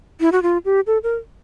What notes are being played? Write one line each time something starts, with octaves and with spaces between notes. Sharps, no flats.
E4
F#4
F4
G4
A4
A#4